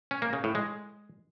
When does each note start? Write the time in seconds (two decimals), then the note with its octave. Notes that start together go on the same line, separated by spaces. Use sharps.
0.11 C#4
0.22 A#3
0.33 C#3
0.44 A2
0.55 G#3